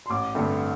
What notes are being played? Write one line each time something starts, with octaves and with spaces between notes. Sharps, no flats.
C6
A1 D6
G2 D3 A3 C4